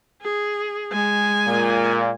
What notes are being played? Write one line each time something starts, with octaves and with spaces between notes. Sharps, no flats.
G#4
G#3 G#5
A#2